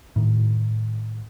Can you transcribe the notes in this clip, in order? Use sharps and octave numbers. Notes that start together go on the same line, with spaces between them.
A2 D#3